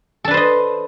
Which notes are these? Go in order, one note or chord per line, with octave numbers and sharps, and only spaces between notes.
D4 A4 B4 C5 D#5